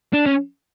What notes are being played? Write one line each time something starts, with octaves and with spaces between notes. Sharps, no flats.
D4
C#4